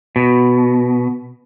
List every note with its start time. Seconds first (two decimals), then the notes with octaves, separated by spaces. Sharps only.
0.16 B2